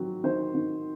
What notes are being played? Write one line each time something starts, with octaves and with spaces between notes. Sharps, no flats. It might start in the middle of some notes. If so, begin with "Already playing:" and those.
Already playing: D#3 F#3 C4
D#3 C5
D#3